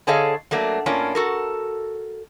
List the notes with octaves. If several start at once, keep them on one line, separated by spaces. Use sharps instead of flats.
D3 G#4 A4 C#5 D#5 F5
F#3 A3 A#3 D4
A2 A#3 C#4 D4 F4
F#4 A4 A#4